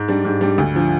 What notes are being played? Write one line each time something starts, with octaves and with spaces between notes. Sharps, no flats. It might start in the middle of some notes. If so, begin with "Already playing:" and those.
Already playing: G#2
G3 D4
G#2
G3 D4
D2
D3 F3